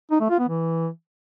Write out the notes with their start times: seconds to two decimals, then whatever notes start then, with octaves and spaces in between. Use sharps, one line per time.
0.11 D#4
0.20 A3
0.30 F4
0.39 B3
0.48 E3